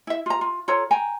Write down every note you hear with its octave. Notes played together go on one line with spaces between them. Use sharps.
E4 E5
F4 A#5
F4
F4 A4 C#5 A#5
G5 G#5 A#5